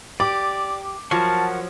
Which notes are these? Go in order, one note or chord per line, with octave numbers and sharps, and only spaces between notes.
G4 D5 D6
F3 F#3 A#4 F#5 A5 C#6